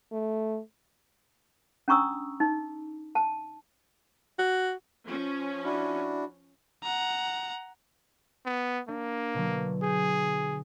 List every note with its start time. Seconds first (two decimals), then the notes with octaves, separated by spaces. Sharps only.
0.12 A3
1.88 C#4 D4 A#5 C#6 D#6 E6
2.40 D#4
3.15 A5
4.39 F#4
5.06 F3 C#4
5.65 D4 E4 F#4
6.83 F#5 A#5
8.46 B3
8.88 A#3 D4
9.34 B2 D3 F#3
9.82 G#4 G6